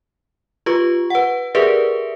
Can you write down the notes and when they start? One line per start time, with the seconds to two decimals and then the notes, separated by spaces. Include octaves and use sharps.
0.66 F4 G4 B4 C#6
1.10 B4 F#5
1.55 G4 G#4 A#4 B4 D5 E5